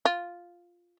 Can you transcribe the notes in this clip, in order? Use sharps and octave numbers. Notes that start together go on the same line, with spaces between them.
F4